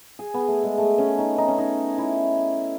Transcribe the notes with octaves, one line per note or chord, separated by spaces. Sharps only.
G#4
B3
A3
G#3
A3
C#4
D#4
D#4
C#4
D#4
E4